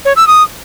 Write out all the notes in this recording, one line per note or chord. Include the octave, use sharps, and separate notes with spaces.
C#5
E6
D#6